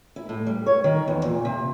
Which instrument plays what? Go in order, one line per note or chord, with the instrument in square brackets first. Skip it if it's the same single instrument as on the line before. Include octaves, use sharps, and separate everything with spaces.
[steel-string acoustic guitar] E4
A2
G3
C#5
D#3
E2
A#2
C3